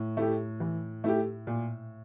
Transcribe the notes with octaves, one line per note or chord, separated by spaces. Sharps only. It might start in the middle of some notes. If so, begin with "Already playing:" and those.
Already playing: A2
A3 E4 G4
E3
A3 E4 G4
A#2